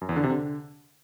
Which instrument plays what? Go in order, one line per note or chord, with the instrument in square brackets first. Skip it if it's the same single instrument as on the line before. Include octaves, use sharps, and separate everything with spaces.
[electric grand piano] F#2
E2
D3
C3
D3